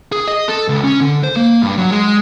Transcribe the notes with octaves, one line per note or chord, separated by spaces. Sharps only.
G#4
D#5
A4
C#2
C#4
D3
C5
A#3
G2
F#3
G#3